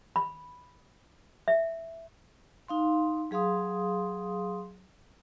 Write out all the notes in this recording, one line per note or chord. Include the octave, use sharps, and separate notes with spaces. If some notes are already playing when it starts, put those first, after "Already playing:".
B5
E5
D#4 F5 C6
F#3 G#4 F5 C6 D#6